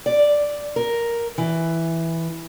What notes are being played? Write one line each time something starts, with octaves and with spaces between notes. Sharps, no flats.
D5
A#4
E3